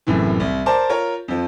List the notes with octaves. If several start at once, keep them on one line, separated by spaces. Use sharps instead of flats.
F#1 F#2 A2 C3 E3
C2
A#4 C5 D5 A5
F4 A#4 C#5
F2 F3